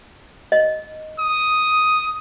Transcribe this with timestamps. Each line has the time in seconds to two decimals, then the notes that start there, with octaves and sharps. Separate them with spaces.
0.52 D#5
1.19 D#6